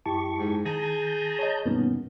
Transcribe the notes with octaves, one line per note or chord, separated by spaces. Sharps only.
F#2 E4 G4 A5 C#6
G#2
D#3 G#4 A5 A#5 G6
C#5 D#5
G2 B2 D#3 A#3 B3 C#4